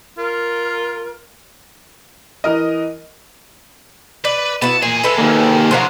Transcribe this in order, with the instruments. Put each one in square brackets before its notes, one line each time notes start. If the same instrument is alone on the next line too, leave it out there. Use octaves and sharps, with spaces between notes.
[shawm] F4 [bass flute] A#4
[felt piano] E3 A#4 D#5
[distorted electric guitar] B4 [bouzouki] D5
[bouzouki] B3 E4 F#4 [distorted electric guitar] A5
[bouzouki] A#2 [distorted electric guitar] E3 G#4
[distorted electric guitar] C3 G#3 [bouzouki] A4 B4 E5
[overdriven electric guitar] D#3 A#3
[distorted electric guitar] C#3 [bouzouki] F3 A#4 F5 [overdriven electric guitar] C5 F#5